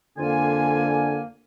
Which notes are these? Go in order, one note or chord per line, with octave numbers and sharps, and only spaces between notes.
F2 D3 A#3 F4 G#5